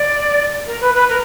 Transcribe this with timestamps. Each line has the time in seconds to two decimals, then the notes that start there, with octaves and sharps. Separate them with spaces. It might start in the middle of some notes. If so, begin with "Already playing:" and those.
Already playing: D5
0.67 A#4
0.81 B4
0.94 B4
1.09 A#4